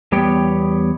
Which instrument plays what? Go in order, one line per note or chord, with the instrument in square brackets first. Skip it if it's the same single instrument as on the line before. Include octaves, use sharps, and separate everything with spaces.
[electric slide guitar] E2 G3 B3 G4 C#5 G5